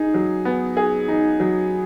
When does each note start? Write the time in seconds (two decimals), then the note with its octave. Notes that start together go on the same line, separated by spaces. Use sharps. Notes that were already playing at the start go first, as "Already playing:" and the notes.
Already playing: D#4 G#4
0.14 F#3
0.45 B3
0.77 G#4
1.08 D#4
1.40 F#3